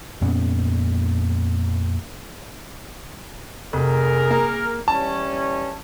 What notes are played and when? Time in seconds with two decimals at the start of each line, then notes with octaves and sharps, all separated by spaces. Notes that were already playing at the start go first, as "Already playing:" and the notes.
0.21 F2 A#2 B3 C#4
3.73 F1 G#4 A#4
4.31 A#3
4.88 E3 G3 C#4 A5